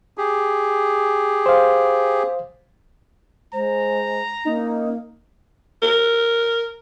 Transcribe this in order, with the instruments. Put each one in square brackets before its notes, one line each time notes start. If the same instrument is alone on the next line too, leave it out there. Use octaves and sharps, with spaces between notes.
[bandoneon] G4 G#4
[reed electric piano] C5 F5
[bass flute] G#3 [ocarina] C5 [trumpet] A#5
[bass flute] A#3 [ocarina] C#4 [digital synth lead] D#4
[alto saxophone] A#4